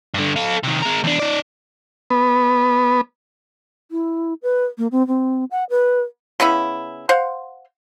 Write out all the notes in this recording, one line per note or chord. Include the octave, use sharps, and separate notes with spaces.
G2 D3
A4 F5
C3 D#3
G#3 A#4
E2 D4
D#4 D5
B3
E4
B4
A#3
C4
C4
F#5
B4
C#3 B3 C#4 E4
C5 F5 F#5